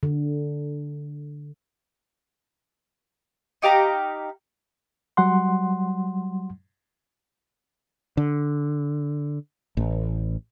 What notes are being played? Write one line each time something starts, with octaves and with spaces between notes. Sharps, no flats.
D3
D#4 G4 F5 A#5
F#3 G3 F#5 C6
D3
A1